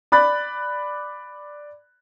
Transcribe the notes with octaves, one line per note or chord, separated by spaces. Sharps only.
D5 B5 F#6 A6